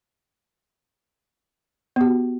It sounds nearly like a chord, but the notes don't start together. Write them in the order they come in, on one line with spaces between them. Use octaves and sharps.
B3 G4 F#4